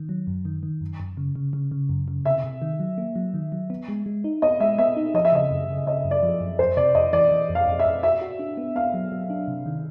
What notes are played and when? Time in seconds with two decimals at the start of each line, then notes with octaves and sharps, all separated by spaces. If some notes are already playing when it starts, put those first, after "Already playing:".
Already playing: D#3
0.09 F#3
0.27 F#2
0.45 D#3
0.63 D#3
0.81 F#2
1.00 F#2
1.17 C#3
1.35 C#3
1.53 C#3
1.71 C#3
1.89 F#2
2.08 C#3
2.25 C3 E5
2.44 C3
2.62 D#3
2.80 F#3
2.98 A#3
3.16 F#3
3.34 D#3
3.52 F#3
3.70 B3
3.88 G#3
4.06 G#3
4.24 D#4
4.42 B3 D#5
4.60 G#3 E5
4.78 B3 E5
4.97 D#4
5.14 F3 D#5
5.25 E5
5.33 C#3 D#5
5.51 F#2
5.69 C#3
5.87 C#3 D#5
6.05 F#2
6.11 D5
6.23 F3
6.41 F#2
6.59 F2 C5
6.77 C3 D5
6.95 F2 D#5
7.13 E3 D5
7.31 E3
7.50 F2
7.55 F5
7.67 F2
7.79 E5
7.86 F2
8.03 F#4 E5
8.22 F#4
8.39 D4
8.57 B3
8.75 B3 F5
8.94 F#3
9.12 F#3
9.30 D4
9.48 C3
9.66 D#3